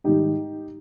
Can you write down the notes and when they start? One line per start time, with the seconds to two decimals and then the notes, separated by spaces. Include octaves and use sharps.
0.04 G#2 D#3 G3 D#4 G4